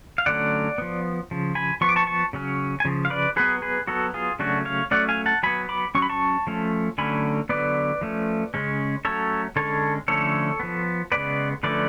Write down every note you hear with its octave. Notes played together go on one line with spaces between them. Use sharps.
F5
D3 F#3 A3 C#4 D5 F#5
F3 B3
C#3 F3
G#5 B5
F3 B3 C#6
D6
A5 C#6
A5 C#6
C#3 F#3 C#4
G#5
C#3 F3
F5
B4 D5
F#3 B3 G#4 B4
G#4 B4
F#3 B3 F#4 A4
F4 G#4
C#3 F#3 A3 C#4 D4 F#4
C#5 F5
F#3 A3 C#4 D5 F#5
F5 G#5
F#5 A5
F#3 B3 G#5 B5
B5 D6
F#3 C#4 C#6
B5
A5 C#6
F3 A3 C#4
D3 F#3 A3 C#4 G#5 B5
D3 F#3 B3 B4 D5
F3 A3 C#4
C#3 G#3 C#4
F#3 A3 C#4 A4 C#5
D3 G#3 C#4 A4 C#5
D3 F3 A3 C#4 A4 C#5
F3 B3
C#3 G#3 B3 B4 D5
D3 F3 A3 C#4 B4 D5